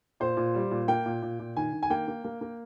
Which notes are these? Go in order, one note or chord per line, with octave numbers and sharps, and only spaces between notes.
A#2 C5
A#2
G3
A#2
A#3 G5
A#2
A#2
A#2
D#3 G#5
D#3
G#5
A#3 G5
A#3
A#3
A#3